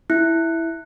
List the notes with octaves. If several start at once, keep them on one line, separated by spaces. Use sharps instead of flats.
E4